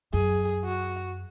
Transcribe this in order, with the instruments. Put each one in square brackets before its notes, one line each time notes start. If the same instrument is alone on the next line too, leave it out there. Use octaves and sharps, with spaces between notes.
[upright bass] F#2 [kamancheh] G#4
[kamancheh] F#4